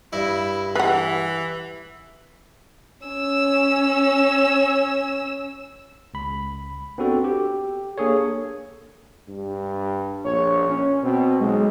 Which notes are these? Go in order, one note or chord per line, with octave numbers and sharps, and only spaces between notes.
G2 E4
E3 B4 F#5
C#4 E6
C#2 B5
B3 C4 D4 F#4 A4
G4
A#3 D4 G#4 A4 C#5
G2
A#1 C#5
C#4
B2 C4
B1 G#3